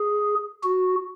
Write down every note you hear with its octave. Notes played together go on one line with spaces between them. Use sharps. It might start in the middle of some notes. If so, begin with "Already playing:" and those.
Already playing: G#4
F#4